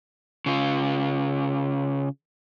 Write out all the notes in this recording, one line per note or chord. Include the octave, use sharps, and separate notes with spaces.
C#3 F4